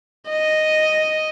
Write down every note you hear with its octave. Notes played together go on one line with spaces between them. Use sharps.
D#5